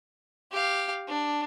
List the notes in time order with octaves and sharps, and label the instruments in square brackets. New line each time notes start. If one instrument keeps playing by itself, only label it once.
[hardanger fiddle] G4 F5
D4